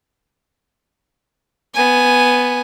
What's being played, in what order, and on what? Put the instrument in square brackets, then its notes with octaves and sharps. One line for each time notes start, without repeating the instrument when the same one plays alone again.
[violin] B3 G#5